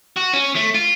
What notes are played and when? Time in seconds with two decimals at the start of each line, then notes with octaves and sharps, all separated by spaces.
0.16 F#4
0.33 C#4
0.55 A3
0.74 F4